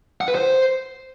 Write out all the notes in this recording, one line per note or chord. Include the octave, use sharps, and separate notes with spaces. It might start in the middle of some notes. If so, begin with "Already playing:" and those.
F#5
B4
C5